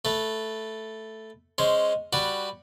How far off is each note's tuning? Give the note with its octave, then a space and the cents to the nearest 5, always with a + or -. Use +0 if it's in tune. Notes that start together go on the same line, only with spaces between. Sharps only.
A3 +0 B4 +0
G#3 +0 C#4 +0 C5 +0
G3 +0 F#4 -5 B4 +0